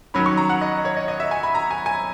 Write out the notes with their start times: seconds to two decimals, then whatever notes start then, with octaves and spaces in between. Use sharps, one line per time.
0.14 D#3 F#3 C#4 B5
0.26 C#6
0.37 A#5
0.50 F#5
0.61 D#5
0.85 C#5
0.96 D#5
1.08 D#5
1.20 E5
1.31 G#5
1.43 B5
1.55 A#5
1.71 G#5
1.86 G#5